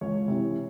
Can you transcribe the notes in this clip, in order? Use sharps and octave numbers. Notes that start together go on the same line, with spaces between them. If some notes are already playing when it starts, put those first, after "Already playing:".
C#2 C#5
C3 E3